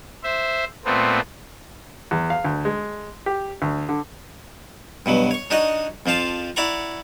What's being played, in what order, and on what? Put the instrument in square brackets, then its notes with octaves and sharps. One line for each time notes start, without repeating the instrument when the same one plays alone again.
[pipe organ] C5 E5
A#2 A3 B3 C4
[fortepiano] E2
F5
D2
G#3
G4
D2
D3
[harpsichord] G2 B2 F#3
C#5 C#6
D4 D#4 F#4 C#5 D#5
F2 F3 F4 F5 A5
E4 D5 F#5 A#5 C#6